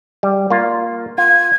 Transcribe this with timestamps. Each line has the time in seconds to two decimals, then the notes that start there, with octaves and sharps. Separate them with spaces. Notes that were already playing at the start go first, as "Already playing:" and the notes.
0.23 G3
0.50 A#3 F4
1.18 F4 G#6